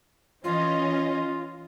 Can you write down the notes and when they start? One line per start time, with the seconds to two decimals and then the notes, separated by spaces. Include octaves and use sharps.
0.44 E3 C#4 F4 D#5